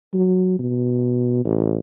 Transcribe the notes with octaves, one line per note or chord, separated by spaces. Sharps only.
F#3
B2
A1